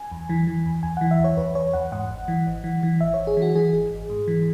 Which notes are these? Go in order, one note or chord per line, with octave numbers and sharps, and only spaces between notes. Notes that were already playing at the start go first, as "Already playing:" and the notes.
Already playing: G#5
E2
E3
E3
E2
E2 G#5
E3 F#5
E5
E2 C#5
E2 B4
E2 C#5
E2 F#5
G#2 F#5
G#1
E3
G#1
E3
E3
G#1 E5
G#1 C#5
G#4
E3
F#4
E3 G#4
G#1
G#1
G#2
E3